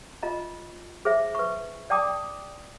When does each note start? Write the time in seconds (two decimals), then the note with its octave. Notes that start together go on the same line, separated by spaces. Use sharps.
0.23 F4 D#5 A#5
1.05 G#4 C5 E5
1.35 B4 C#6
1.90 D5 G5 A5 D6 D#6